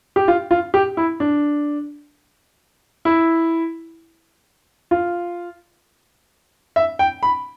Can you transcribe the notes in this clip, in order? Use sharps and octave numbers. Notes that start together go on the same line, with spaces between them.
G4
F4
F4
G4
E4
D4
E4
F4
E5
G5
B5